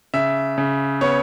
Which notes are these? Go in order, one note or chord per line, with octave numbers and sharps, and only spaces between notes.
C#3 E5
C#3
B3 C#5